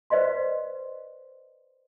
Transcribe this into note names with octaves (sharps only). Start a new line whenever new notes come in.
B4 C5 D5 D#5 F5 C6